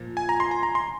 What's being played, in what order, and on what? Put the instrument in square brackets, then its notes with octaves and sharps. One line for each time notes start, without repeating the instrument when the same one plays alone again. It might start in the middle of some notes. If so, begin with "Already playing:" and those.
Already playing: [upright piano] A#2 F3
[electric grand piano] G#5
A#5
C6
A#5
A#5
C6